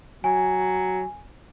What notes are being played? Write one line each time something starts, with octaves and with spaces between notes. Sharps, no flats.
F#3 G#5